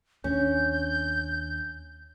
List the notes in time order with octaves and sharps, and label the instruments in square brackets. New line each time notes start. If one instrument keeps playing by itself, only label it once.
[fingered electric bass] D#2 D4 [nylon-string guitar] C#4 [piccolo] G6